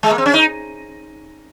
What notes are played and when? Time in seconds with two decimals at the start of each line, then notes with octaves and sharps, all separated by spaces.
0.03 G#3
0.11 A#3
0.18 C4
0.26 C#4
0.34 D#4